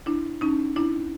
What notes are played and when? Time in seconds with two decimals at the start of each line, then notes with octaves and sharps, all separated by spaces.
0.06 D4 E4
0.41 C#4 D#4
0.76 D4 E4